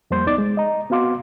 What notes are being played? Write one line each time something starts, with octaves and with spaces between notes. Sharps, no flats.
F2 G3 A#3 C5 C6 G6
C2 B3 D#4 D5 D6 A6
G#3
D#5 A#5
B3 C4 F#4 F5 C6 D6